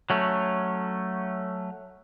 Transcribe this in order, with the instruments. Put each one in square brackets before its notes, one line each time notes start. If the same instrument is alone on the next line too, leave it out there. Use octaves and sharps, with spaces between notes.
[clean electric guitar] F#3 A3 C#4